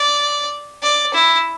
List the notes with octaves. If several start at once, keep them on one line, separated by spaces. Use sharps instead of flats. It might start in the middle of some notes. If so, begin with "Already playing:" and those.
Already playing: D5
D5
E4